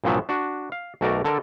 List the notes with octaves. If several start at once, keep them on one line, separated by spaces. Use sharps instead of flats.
C2 G2 A#2 F3 F#3 E5
D4 F#4
F5
B1 A3 F#4 A#4 D5 A#5
D3 A4 A#4 D5